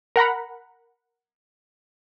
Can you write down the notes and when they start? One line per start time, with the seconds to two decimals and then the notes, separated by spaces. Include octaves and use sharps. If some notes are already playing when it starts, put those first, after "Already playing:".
0.16 A#4 F#5 A#5 B5